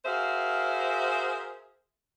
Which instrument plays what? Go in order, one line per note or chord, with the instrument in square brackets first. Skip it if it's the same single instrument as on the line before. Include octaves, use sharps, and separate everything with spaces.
[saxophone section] F#4 G#4 A#4 C5 E5 F5